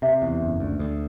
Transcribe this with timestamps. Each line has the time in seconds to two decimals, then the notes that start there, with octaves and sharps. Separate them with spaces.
0.02 C3 E5
0.22 E2
0.41 F#1
0.60 D2
0.79 D2